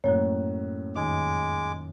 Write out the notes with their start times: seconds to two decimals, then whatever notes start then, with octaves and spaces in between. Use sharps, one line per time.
0.04 F#2 A2 F#3 A#3 C#5 F#6
0.96 F2 D#3 G#3 D#4 D6